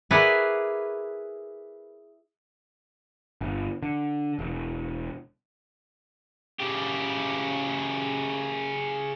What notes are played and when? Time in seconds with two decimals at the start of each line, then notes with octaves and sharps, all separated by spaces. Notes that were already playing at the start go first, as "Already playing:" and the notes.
0.11 E4 G#4 A#4 B4 D5 F#5
3.41 G1
3.82 D3
4.39 E1
6.60 C#3 G4